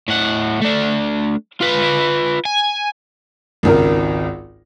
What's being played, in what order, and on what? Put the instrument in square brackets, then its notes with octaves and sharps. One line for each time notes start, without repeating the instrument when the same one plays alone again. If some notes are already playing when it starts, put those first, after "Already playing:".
[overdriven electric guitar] A2 F#5
A3 D4
F4 B4
G#5
[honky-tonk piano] G#1 C#2 A#4